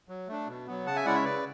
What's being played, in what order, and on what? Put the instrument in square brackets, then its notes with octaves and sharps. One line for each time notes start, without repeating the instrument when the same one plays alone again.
[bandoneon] F#3
A3 D4
B2
F#3 B3
C#3 F#5 A5
E5 G#5
G#3 C#4 E4 D5 F#5
C#5 E5
C#3 B4 D5